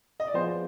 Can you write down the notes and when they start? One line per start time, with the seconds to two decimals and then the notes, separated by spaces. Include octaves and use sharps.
0.20 D#5
0.27 D5
0.34 F3 B3 F4 G#4 C5